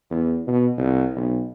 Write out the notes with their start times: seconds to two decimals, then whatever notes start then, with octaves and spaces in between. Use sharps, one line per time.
0.11 E2
0.47 B2
0.78 C2
1.16 B1